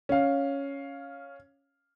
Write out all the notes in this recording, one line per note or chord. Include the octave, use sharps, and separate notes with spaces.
C#4 F5